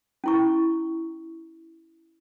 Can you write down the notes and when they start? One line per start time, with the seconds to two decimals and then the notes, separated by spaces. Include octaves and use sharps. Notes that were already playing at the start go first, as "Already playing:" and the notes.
0.24 C#4 E4 C#6